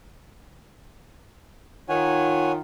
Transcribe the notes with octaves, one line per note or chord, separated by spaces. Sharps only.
D#3 F4 C#5 F#5 G#5